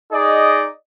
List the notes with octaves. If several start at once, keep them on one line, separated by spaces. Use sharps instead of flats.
D#4 G#4 D5 D#5